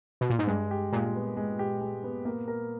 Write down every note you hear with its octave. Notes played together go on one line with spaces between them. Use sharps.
B2
A#2
G#2
G2 G#3
G4
A#2 G#3
B3
G#3
G4
G#3
B3
A#3
A#4